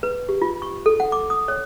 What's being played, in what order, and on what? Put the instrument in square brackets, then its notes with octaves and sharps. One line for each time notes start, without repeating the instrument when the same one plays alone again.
[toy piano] B4
G4
F4
C#6
A4
F#5
D6
D#6
C#5